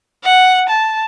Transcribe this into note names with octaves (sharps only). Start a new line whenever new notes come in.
F#5
A5